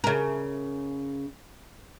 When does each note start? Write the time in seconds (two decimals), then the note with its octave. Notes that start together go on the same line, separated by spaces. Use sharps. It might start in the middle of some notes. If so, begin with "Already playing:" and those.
0.04 C#3 A#4